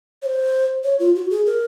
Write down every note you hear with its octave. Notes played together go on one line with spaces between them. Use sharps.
C#5
C5
C#5
F4
F#4
G#4
A#4